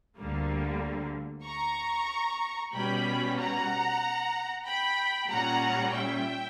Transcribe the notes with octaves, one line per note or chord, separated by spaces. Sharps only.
D2 D3 G3 A#3
A#5 C#6
B2 G3 C#4 G5 B5
F#5 A#5
G5 B5
A#2 G3 C#4 F#5 A#5
E5 G5